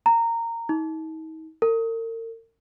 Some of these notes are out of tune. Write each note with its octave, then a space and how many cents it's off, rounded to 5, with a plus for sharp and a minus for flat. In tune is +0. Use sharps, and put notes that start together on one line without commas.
A#5 -15
D#4 +40
A#4 -40